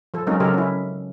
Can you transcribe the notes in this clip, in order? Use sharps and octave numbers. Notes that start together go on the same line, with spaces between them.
F3 A4
F#3 G#3 C4 C#4 D#4 A#4
C#3 F#3 G4 A4 A#4
C#4 E4